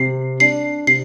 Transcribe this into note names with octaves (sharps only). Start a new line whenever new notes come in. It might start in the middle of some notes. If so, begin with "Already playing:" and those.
Already playing: C3 C7
D4 C7
C3 C7